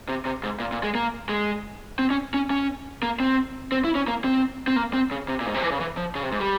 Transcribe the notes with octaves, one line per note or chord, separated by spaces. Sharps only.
C3
C3
G#2
A#2
A#2
G#3
A#3
G#3
C4
C#4
C#4
C#4
A#3
C4
C4
E4
C#4
A#3
C4
C4
A#3
C4
C#3
C3
A#2
G#2
C3
E3
C#3
E3
F3
C#3
C3
G#2
G3